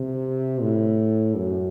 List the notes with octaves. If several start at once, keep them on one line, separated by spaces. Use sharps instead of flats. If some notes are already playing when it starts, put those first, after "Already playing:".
Already playing: C3
A2
F#2